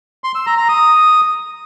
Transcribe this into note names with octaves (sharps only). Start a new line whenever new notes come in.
C6
E6
A#5
A#5
D#6